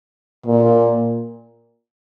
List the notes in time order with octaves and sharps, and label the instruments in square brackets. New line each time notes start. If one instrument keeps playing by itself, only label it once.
[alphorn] A#2